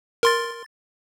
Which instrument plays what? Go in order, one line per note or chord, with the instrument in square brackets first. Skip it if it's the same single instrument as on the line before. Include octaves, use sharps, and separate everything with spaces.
[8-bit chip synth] A#4 C6 A6